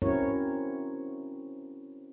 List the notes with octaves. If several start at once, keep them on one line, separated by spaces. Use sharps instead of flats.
C4 C#4 E4 F#4 A#4 C#5